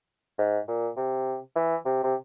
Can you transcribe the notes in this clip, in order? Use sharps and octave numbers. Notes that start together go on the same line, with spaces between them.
G#2
A#2
C3
E3
C3
C3